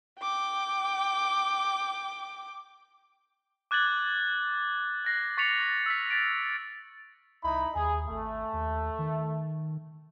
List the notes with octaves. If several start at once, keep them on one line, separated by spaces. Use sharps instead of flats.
G5 D6
D6 F#6 G#6 A6 F#7
F#6 A#6 C7
C#6 A6 B6 C#7 F7 F#7
E6 F6 B6
A6 B6 D7
C2 D#4 E4 B5
D#2 G#4
G#1 A3
D#2
D#3